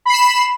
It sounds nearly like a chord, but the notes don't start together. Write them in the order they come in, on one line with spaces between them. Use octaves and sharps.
B5 C7 E7